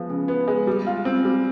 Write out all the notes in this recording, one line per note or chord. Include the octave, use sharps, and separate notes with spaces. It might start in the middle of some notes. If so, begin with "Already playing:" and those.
Already playing: F3 G#3 B3
C#3
B3
G#3
G3
F4
C4
G3